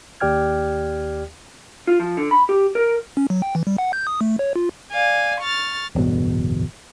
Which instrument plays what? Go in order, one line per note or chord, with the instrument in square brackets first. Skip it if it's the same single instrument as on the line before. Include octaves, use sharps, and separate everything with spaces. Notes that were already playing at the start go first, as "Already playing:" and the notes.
[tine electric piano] D#2 G4 D5 G5 F6 G#6
[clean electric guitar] F4
F3
D3
B5
G4
A#4
[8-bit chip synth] C#4
F#3
G5
E3
G3
F#5
G6
D#6
A3
C#5
F4
[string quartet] D5 F5 G#5
C#6 F6 A6
[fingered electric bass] D1 G1 E2 B2